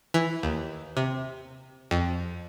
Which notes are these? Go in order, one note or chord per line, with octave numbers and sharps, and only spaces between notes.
E3
D#2
C3
F2